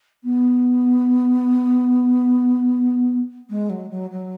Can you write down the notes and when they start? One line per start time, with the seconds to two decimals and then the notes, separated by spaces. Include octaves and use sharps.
0.24 B3
3.50 G#3
3.69 F#3
3.90 F#3
4.10 F#3